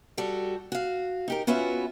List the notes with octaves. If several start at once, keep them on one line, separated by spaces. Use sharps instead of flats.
G3 F#4 G4 A4
F#4 F5
D#4 G4 A#4
B3 C#4 F4 F#4 B4 E5